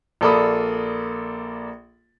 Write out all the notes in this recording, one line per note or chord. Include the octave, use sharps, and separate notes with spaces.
A#1 A#3 A4 D5 B5 D#6